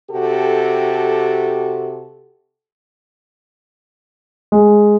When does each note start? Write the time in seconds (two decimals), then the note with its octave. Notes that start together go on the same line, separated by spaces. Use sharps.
0.10 C3 F#4 G4 A4
4.52 G#3